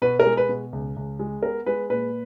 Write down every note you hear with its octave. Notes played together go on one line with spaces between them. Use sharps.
B2 B4
A#4
G#3
B4
B2
C#2
C#2
G#3
B3 A#4
G#3 B4
A#2 B4